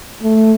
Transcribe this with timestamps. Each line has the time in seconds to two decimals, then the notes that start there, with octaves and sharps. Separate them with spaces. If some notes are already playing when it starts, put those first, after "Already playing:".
0.23 A3